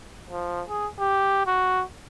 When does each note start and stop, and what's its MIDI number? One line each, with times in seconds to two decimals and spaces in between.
0.30 0.62 53
0.68 0.87 68
0.99 1.43 67
1.47 1.83 66